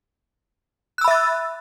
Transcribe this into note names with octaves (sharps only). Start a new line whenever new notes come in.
E5 B5 E6 F#6 A6